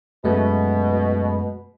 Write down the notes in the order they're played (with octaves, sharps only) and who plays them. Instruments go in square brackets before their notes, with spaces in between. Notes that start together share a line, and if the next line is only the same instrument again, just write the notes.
[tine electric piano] F#2 G#3 A3 [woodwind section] B2